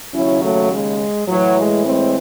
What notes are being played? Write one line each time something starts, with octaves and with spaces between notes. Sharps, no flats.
D#2 C#3 F#3 C#4 E4
F#3 A3
G#3
A2 E3 F#3
G#3
G#3 C4